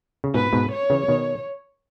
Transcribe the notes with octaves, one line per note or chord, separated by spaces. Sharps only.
C#3
G#2 B2 B4
G#2 B2
C#5
C#3 E3
B2 D#3